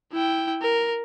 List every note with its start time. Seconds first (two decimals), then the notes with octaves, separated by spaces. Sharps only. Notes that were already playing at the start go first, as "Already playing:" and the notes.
0.12 E4 G5
0.62 A#4